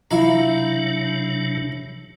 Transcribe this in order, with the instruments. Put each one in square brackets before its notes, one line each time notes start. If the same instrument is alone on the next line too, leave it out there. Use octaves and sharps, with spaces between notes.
[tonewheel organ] C3 F#3 D4 [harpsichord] E4 F5 A#5